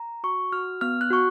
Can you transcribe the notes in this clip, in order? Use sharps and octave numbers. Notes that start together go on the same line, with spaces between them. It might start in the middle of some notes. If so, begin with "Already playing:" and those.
Already playing: A#5
F#4 C#6
F#4 F6
B3 F6
F#6
F#4 C#6